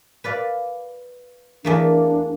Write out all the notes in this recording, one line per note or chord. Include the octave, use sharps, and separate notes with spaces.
B4 D5 F5
E2 A3 A#3 D4